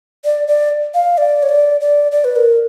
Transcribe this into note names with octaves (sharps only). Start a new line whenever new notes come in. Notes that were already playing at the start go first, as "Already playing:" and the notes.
D5
D5
F5
D5
C#5
D5
D5
D5
B4
A#4